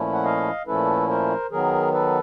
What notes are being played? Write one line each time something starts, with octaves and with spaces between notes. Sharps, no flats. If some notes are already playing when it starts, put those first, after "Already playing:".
Already playing: A#2 F3 A3 C#4 E4
F#5
D#5 F5
A#2 F3 A3 C#4 E4 A4 B4
A#4 C5
D#3 F#3 B3 G#4 A#4
A4 B4